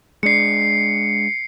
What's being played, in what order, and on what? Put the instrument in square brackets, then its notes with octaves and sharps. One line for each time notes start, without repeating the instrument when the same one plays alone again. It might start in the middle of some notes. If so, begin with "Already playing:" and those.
[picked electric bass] G#3 D4 [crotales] C7 C#7